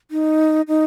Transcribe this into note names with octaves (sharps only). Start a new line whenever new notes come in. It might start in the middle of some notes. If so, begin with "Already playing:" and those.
D#4
D#4